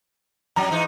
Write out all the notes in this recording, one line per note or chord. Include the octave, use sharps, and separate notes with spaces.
F2 F#3 A#5
G#2 E3 D#4